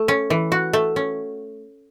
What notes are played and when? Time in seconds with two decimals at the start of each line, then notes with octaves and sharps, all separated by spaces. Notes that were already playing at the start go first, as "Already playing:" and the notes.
Already playing: A3
0.08 C#4
0.30 E3
0.52 F#4
0.73 A3
0.96 C#4